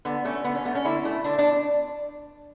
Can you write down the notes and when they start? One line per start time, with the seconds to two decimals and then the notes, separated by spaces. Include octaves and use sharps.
0.05 D3 B3
0.25 A3 C#4
0.44 D3 B3
0.55 C#4
0.65 A3 B3
0.75 C#4
0.85 D3 E4
1.05 A3
1.24 D3 D4
1.39 D4